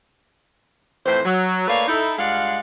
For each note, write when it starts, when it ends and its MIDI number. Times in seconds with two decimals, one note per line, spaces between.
1.06 1.20 41
1.06 1.20 45
1.06 1.20 52
1.06 1.20 72
1.25 1.67 54
1.68 1.88 57
1.68 1.88 58
1.68 1.88 71
1.68 1.88 73
1.68 1.88 74
1.68 1.88 77
1.88 2.15 63
1.88 2.15 64
1.88 2.15 69
2.19 2.59 43
2.19 2.59 56
2.19 2.59 65
2.19 2.59 74
2.19 2.59 77
2.19 2.59 78